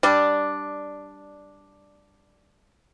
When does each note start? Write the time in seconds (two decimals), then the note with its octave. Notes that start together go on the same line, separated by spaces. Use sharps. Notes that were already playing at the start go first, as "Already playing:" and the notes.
0.03 G3 D4